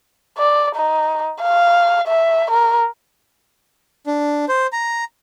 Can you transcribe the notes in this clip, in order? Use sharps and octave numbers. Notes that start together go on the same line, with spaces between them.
D5
D#4
F5
E5
A#4
D4
C5
A#5